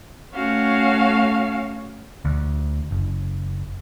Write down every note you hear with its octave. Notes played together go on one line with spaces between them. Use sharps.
A3 C#4 F#4 F5
D2
F#1